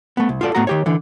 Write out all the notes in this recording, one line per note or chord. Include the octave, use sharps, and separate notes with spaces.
A3 B3
C2
F4 F#4 A4 D5
A2 A3 B3 F#4 A#5
D#3 G4 C#5
D3 E3